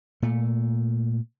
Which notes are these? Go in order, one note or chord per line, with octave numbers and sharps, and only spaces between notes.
A#2 A3